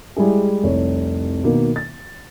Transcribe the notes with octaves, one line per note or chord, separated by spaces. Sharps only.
G3 G#3 E4 G#4
F1 C2 C#5
B2 D#3 A#3
A6